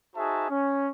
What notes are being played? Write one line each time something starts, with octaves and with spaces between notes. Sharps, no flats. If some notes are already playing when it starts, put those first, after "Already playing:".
D#4 F#4 G#4 C5 E5 A5
C#4